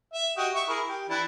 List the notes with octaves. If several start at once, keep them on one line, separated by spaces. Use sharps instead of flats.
E5
F#4 G4 D#5
E5 C#6
E4 G#4 A#4
G4
E3 D4 E4